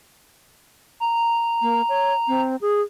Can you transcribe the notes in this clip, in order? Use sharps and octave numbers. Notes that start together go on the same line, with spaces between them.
A#5
A#3
C#5
C4
G#4